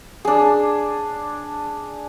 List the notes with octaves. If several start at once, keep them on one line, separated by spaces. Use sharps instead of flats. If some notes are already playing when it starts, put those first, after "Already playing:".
D4 G#4